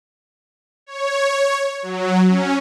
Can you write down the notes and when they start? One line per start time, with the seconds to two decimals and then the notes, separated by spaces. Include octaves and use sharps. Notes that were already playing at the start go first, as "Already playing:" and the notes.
0.86 C#5
1.83 F#3
2.27 C#4